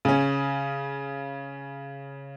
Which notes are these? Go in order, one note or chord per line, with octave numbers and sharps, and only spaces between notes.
C#3 C#4